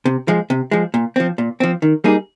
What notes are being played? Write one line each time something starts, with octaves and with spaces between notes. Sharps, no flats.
C3
F3 G#3
C3
F3 G#3
A#2
F3 C4
A#2
F3 C4
D#3
G3 A#3 D#4 G#4